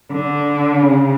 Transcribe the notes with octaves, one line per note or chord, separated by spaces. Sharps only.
D3
C#3